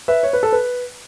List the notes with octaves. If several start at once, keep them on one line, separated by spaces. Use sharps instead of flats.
B4 E5
C#5
B4
A4
B4